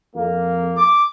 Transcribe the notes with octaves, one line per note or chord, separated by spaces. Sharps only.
F2 A#3
D6